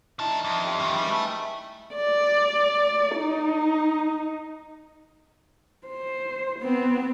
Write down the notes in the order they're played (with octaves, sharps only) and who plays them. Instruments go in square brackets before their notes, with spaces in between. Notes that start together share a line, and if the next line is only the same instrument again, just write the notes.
[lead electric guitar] D#3 A5 [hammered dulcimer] D#4 E4 D5
[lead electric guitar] F2
[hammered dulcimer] C#4 G4 A#4
[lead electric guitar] D#3 F3
[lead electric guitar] G3 [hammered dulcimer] G#4 B4
[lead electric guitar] A3
[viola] D5
D#4
[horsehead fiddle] C5
B3 C4